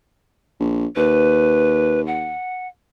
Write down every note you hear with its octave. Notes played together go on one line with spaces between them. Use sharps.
A#1
D#2 B4
F#5